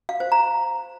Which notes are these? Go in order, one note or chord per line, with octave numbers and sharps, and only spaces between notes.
F5
C5
A#5